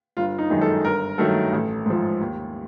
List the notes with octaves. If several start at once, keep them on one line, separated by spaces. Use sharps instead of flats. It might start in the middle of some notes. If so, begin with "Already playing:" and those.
G1 F4
D#4
F#2 D#3 G#3
A4
G1 A#4
G2 D#3 F#3 A3 A4
A1
G#2 F3
D#2